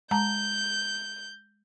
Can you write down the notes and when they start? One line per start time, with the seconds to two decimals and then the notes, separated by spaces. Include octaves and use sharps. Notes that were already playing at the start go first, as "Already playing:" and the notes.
0.11 G#3 A5 A#5 G6